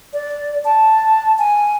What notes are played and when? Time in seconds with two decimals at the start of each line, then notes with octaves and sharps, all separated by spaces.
0.13 D5
0.65 A5
1.39 G#5